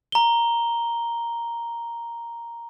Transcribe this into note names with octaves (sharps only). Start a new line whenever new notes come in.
A#5 G7